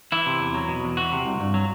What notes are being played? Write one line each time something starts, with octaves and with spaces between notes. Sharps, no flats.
E3 E4
C3
E2
F#3
B2
E2
E3 F#4
C3
C2
G2
F#3